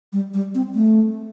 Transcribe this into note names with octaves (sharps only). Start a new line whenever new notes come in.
G3
G3
C4
A3